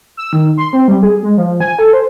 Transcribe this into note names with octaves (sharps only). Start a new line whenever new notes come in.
E6
D#3
C6
C4
G3
G#4
G#3
F3
G#5
A4
C5